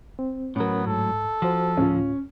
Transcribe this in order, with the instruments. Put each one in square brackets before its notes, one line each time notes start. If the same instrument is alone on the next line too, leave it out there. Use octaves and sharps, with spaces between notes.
[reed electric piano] C4
[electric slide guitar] A2 F#3 [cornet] B3 [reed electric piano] C#4 A#4
[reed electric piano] G#2 [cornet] A4
[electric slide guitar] F3 [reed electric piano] F#4 C5
[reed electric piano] D2 A2 F4 [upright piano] C#4